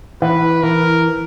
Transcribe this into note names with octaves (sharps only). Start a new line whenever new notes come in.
E3 B4
E3 A#4